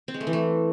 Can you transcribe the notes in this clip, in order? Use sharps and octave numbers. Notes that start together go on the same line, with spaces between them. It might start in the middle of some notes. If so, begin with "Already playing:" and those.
C4
G#3
A3
E3
A3